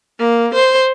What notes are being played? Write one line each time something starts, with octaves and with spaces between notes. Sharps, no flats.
A#3
C5